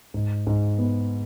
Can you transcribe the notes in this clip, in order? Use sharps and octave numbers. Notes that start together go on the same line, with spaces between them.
G#2
G#2
B3